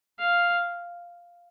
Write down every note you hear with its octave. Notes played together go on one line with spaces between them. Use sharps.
F5